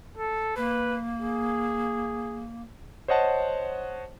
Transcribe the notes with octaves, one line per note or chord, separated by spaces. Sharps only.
A4
A#3 B4
G#4
C5 C#5 D#5 F#5 A5